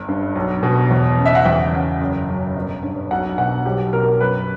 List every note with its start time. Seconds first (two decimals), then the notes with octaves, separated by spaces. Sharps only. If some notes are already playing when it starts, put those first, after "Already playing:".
Already playing: G1
0.08 G2
0.35 B1
0.63 B2
0.91 E2
1.19 C#3
1.26 E5
1.35 F#5
1.45 E2 G5
1.73 C#3
2.01 F#1
2.29 F#2
2.56 G1
2.83 G2
3.11 B1 F#5
3.38 B2 F#5
3.66 B1 G4
3.93 B2 A#4
4.21 F#2 B4